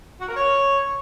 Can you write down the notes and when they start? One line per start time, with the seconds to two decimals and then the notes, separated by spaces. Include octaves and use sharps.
0.20 F#4
0.29 A#4
0.37 C#5